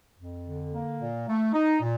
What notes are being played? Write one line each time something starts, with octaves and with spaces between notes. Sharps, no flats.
F2
D3
A#3
A#2
A3
D#4
A#2